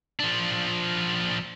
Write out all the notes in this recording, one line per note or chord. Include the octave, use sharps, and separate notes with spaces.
F3 D4